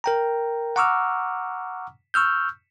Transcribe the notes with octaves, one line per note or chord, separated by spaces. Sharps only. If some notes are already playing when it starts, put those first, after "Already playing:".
A#4 G5 A#5
F#5 A#5 C#6 D6 E6 F6
C#6 E6 F6 G6